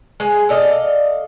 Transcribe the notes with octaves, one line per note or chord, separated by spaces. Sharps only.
G#3 G#5
A4 D5 D#5 F5